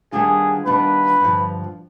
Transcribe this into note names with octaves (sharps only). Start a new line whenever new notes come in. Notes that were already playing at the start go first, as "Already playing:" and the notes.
D#3 G3 B3 D4 F4 G#4
D#3 G3 B3 D4 F4 B4
G2 D3 F3